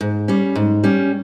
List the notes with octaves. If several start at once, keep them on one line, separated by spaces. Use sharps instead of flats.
G#2
G3 C#4
G#2
G3 C#4